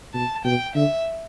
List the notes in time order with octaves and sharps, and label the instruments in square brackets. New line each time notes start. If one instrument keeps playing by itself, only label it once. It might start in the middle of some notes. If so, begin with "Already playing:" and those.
[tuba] B2 [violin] A5
[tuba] B2 [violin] G5
[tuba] D3 [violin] E5